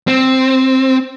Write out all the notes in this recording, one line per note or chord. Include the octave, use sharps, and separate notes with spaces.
C4